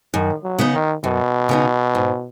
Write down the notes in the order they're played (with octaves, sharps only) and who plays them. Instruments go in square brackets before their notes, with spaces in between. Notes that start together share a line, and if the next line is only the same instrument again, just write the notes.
[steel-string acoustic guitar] F#2 [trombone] D#3
[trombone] F#3
[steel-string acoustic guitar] C#3 B3 D#4
[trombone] D#3
[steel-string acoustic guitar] F#2 [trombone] B2
[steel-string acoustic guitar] C#3 B3 D#4
G#2